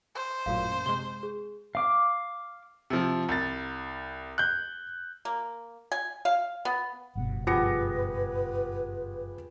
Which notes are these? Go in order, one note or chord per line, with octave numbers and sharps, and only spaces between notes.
C5
A1 F#2 A#2 F5
C3 G#3 C6 G7
G#4
F5 D6
C3 F3
C2 A6
F#6 G6
A#3
G#5
F5
B3
F#1 G2 B2 F#5
F3 B3 G4 G#4 B4 A#6 C#7